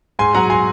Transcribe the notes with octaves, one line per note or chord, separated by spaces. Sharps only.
G#2 G#5 C6
F#3 F#5 A#5
G#5 C6